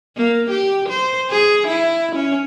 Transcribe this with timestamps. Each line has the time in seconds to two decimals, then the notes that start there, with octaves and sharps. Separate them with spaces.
0.17 A#3
0.51 G4
0.89 C5
1.30 G#4
1.67 E4
2.15 C#4